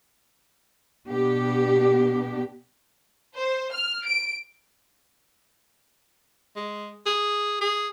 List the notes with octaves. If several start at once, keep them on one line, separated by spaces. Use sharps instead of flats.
B2 B3 D4 G4
C5
F6
D7
G#3
G#4
G#4